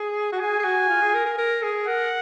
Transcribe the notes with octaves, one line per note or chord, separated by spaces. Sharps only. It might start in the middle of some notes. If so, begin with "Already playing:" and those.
Already playing: G#4
F#4
G#4 G#5
G#4
F#4
F4
G#4
A#4
A#4
A#4
G#4
A#4 F#5